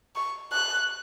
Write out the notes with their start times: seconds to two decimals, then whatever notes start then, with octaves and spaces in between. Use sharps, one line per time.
0.16 C#6
0.53 F#6